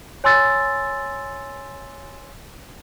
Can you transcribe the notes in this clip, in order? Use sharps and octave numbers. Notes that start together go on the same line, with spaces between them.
C#5 G#5 C6 E6 A6